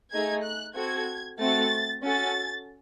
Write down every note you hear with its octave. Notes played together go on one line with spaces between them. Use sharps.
A3 D#4 G#4 G#6
F#6
C4 F#4 A4 G#6
A3 C4 F#4 A6
C#4 F#4 A4 A6